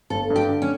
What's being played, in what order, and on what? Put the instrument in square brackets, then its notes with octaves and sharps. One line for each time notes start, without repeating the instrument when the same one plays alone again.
[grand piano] G1 [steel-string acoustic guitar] A4
[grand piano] G2
[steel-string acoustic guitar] G4
[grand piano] D3
[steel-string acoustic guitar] C#4